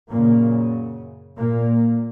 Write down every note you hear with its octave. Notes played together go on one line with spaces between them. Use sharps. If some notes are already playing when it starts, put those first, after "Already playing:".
F#2 A#2 C#3 A#3
A#2 A#3